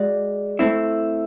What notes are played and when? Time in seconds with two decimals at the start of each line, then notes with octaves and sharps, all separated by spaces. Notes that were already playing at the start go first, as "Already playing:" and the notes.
Already playing: G#3 F#4 D5
0.59 A3 C4 E4